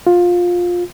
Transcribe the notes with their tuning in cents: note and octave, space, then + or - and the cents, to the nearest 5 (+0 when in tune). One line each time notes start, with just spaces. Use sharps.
F4 +15